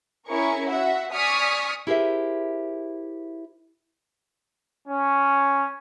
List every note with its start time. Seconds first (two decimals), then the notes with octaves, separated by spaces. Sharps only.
0.27 C#4 E4 G#4 A#4 C#6
0.69 F#4 E5 F#5
1.12 D5 G#5 C#6 D#6 F6 B6
1.87 E4 G4 G#4 A#4 C5 E5
4.88 C#4